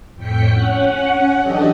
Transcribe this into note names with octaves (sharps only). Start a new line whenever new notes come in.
F2 A2 G5 B6 C#7
C#4 F#5
E3 F#3 D4 G4 A4 D#5